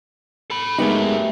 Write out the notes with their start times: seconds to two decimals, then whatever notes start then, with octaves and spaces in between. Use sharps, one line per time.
0.50 A4 B5
0.79 G#3 A3 B3 D#4 F#4 G4 A#4